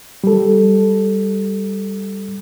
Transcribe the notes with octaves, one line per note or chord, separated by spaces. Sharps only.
G3 A4